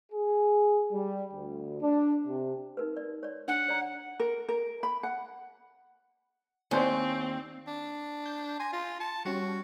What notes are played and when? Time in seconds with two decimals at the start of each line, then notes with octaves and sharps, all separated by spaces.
0.12 G#4
0.92 G3
1.32 D2
1.81 D4
2.25 C3
2.77 D#4 A#4 B4
2.97 D5
3.23 C#5 D5
3.48 D4 F#5
3.68 C#5 D5 A#5
4.20 A#4
4.49 A#4
4.83 B5
5.03 F#5
6.71 D#2 C4 C#4 C5 D5
7.67 D4
8.26 G6
8.60 G#5 C6 A#6
8.72 F4
9.00 A5 C#7
9.25 G3 C#4 F#4